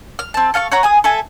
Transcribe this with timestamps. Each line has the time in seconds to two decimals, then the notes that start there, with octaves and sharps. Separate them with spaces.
0.19 F6
0.34 C4 A5
0.54 A4 F5 G#5 C#6
0.72 C#5 F#5 A#5
0.83 G#4 G#5 D#6
1.04 A4 E5 G#5